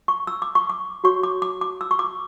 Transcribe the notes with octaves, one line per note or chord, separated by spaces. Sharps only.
C#6
E6
D6
C#6
D6
F#4 C#5 C#6
D6
D6
D6
E6
C#6
D6